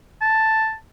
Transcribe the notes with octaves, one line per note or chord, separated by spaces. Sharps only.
A5